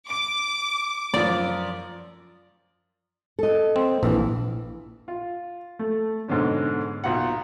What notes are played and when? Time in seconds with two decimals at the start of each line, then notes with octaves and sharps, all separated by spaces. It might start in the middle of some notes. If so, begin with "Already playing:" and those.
0.10 D6 D7
1.14 F#2 F3 D5
3.39 A4 D#5
3.76 C4
4.03 A#1 E3
5.08 F4
5.79 A3
6.28 G#2 B2 D3 C#4
7.04 B1 F4 F#5